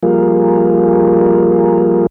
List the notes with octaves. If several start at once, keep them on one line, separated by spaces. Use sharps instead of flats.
F3 G3 A#3 F4 G#4 A#4